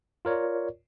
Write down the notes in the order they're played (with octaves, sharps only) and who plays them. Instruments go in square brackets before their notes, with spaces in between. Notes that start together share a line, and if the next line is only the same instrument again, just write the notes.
[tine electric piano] F4 A#4 C#5 D5